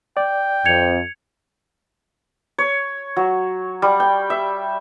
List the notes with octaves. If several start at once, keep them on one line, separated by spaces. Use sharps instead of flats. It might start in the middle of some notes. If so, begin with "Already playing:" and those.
D5 G5
F2 G#6 C#7 F7
C#5
F#3
G3
G5
E5